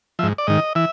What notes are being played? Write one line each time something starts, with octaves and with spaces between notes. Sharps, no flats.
G#2 F3 E5
D5
G#2 D#3 D#5
E3 E5